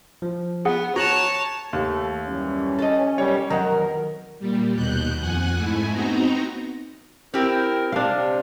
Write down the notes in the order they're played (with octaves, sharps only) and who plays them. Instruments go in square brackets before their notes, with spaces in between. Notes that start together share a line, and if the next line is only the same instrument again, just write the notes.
[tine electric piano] F3
[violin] B3 [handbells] G#4 F#5
[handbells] F#4 [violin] C#5 A5 [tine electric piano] A#5 F#6
[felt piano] D#2 [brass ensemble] A3
[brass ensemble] F#2 E3 G3 [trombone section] C#4
[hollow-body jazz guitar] A4 D#5
[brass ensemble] B1 D#3 G3 [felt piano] C#5
[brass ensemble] F2 B2 A#4 [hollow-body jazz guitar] D#3 F#3 [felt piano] F#5 A#5
[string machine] A#2 G3
D#2 B2 F#6 G6
F2 F#5 G#5 F#6
G#2 A3 E4 G#5
B3 C4 D#4 F#4 A#5
[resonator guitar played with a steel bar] C4 G4 [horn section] E4 A#4
[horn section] C3 [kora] D4 F5